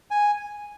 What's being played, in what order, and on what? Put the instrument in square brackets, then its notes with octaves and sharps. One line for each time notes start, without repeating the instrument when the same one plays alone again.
[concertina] G#5